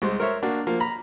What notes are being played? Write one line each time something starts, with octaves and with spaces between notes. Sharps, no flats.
C2 G#3 C5
A#4 C5 C#5 E5
A#3 D4 F#4
F3 A#3
A#5 B5